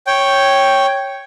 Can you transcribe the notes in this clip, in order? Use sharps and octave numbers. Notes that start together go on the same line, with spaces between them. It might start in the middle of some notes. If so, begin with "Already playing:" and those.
C#5 G5